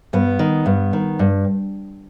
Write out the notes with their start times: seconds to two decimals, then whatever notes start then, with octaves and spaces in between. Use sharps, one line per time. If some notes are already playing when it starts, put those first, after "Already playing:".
0.13 G2 B3
0.39 D#3
0.66 G2
0.93 D#3
1.19 G2